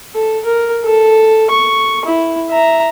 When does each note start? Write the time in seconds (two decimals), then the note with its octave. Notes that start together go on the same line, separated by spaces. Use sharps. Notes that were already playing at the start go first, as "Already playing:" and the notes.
0.15 A4
0.45 A#4
0.85 A4
1.51 C#6
2.05 E4
2.50 E5 A#5